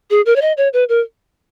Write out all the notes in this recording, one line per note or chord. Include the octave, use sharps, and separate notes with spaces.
G#4
A#4
C#5
D#5
C#5
B4
A#4